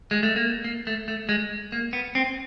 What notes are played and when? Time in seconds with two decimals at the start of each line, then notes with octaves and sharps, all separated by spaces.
0.11 G#3
0.23 A3
0.36 A#3
0.64 A#3
0.87 A3
1.08 A3
1.29 G#3
1.72 A#3
1.93 B3
2.15 C4